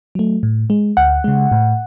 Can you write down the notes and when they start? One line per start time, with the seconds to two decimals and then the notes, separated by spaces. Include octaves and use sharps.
0.15 F#3 A3
0.43 A2
0.70 G#3
0.97 D2 F#5
1.24 C#3 G#3
1.52 A2